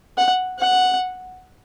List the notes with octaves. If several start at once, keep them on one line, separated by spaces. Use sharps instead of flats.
F#5
F#5